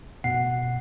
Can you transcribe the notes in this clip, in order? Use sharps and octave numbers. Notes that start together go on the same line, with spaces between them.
B2 F#5 C7